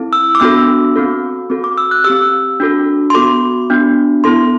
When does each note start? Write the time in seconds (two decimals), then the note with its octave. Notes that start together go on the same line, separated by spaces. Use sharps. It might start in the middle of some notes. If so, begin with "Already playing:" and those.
Already playing: C4 E4 A4
0.13 E6
0.35 D6
0.40 B3 D4 F#4 A4 E6
0.96 C4 F#4 A4
1.50 C4 F#4 A4
1.64 D6
1.78 E6
1.91 F#6
2.04 C4 G4 E6
2.60 D4 F#4 A4
3.10 C6
3.14 B3 F#4 A4 D6
3.70 B3 D4 F#4
4.24 B3 E4 A4 C6